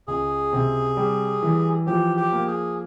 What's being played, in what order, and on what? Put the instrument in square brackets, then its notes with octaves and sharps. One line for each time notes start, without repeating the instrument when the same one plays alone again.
[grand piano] C#2 [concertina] G#4
[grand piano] C3
G3
E3
[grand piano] F3 [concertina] G4
[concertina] G4
[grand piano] A#3
[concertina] G#4